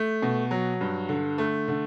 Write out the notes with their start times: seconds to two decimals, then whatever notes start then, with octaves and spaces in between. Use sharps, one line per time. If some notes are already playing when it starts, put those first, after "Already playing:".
Already playing: A3
0.22 B2
0.51 F#3
0.81 G2
1.09 D3
1.38 A3
1.68 D3